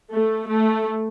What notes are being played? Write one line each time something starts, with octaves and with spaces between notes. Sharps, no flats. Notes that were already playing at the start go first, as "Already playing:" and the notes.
A3
A3